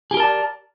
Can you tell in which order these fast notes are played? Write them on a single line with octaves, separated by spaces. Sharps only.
G#4 G4 A#4 A5 D5